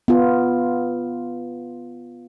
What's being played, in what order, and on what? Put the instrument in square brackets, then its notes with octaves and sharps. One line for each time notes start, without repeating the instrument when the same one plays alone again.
[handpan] B3 F4